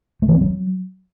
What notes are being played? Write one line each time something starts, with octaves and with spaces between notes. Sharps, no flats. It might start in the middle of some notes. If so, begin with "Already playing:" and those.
A3
E3
C4
F#3